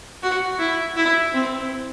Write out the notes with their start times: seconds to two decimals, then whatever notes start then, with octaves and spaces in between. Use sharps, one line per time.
0.23 F#4
0.59 E4
0.97 E4
1.34 C4